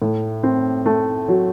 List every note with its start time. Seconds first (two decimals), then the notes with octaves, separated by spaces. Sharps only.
0.02 A2
0.43 C4
0.86 A3
1.28 F#3